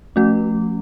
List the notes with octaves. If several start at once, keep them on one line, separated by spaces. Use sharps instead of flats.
F3 A3 C#4 F#4